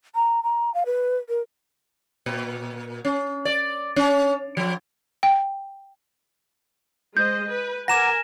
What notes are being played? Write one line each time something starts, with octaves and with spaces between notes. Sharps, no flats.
A#5
A#5
F5
B4
A#4
A#2
C#4
D5
C#4
F3
G5
G#3 C5 D#5 G6
B4
A#4 F#5 G#5 A#5 D6 A#6 E7